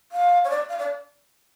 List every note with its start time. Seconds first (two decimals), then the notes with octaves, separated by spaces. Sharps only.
0.12 F5
0.44 C#5
0.50 D5
0.69 F5
0.79 D5